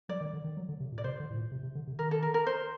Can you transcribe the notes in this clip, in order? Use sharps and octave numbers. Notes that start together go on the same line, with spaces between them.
F#3 D5
D#3
D3
D#3
F#3
D3
C3
A#2
D5
C3 C5
D3
A2
A#2
C3
C3
D3
C3
D#3 A#4
A4
A#4
A#4
C5